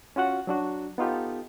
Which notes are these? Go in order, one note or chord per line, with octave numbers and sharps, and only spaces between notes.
C#4 F4 F#4 F#5
F#3 D4 F#4
B3 D#4 F4 G4 A4